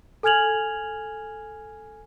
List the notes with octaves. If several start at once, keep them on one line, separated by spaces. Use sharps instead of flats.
A4 G#5 F6 G#6 F7 F#7